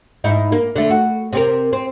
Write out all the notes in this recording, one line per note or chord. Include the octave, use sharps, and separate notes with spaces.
G#2 D#4 E4
A#3
D3 A3
F#4
C3 C4 A#4
C4